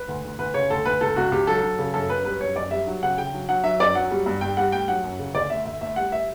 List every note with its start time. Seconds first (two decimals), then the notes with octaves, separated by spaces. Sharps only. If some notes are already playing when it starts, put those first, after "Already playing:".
Already playing: B4
0.08 D2
0.24 D2
0.39 D2 B4
0.54 C#3 C#5
0.70 D2 A4
0.85 D2 B4
1.01 C#2 A4
1.16 C#2 F#4
1.32 C#2 G4
1.47 F#3 A4
1.63 F#3
1.79 C#3
1.93 F#2 A4
2.09 F#2 B4
2.25 G3 B4
2.40 F#2 C#5
2.55 F#2 D5
2.71 G3 E5
2.87 F#3
3.02 C#3 F#5
3.18 C#3 G5
3.33 F#3
3.49 F#3 F#5
3.64 F#3 E5
3.80 F#2 D5
3.95 F#3 F#5
4.11 G3
4.26 G2
4.41 G2 G5
4.57 G3 F#5
4.72 A3 G5
4.88 F#3 F#5
5.04 F#2
5.19 C#3
5.34 D2 D5
5.50 A3 E5
5.66 D2 E5
5.81 A3 E5
5.96 G3 F#5
6.12 E5